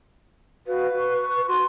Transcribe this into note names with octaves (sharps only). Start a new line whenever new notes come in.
F#4 B4 F5
C#6
F#4 C6